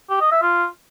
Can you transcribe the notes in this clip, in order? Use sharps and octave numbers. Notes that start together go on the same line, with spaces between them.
G4
D#5
E5
F4